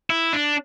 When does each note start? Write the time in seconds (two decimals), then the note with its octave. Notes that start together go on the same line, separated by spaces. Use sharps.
0.10 E4
0.33 D4